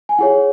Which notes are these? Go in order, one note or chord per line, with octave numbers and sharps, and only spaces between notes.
G#5
E4 G#4 C#5 F#5